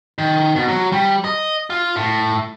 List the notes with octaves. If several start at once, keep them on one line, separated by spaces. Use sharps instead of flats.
D#3
B2
F#3
G3
D#5
F4
A2